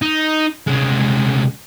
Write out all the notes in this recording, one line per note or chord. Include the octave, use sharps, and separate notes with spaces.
D#4
C2 G#3